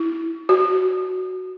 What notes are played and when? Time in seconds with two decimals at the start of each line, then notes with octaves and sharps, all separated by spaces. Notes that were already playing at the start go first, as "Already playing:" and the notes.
Already playing: E4
0.49 F#4